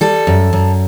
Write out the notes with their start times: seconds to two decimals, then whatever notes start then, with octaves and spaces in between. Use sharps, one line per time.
0.01 G3 A4
0.27 F#2
0.53 F#2